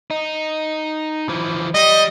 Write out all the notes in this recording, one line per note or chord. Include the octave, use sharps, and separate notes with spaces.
D#4
E3 F3
G3 D#5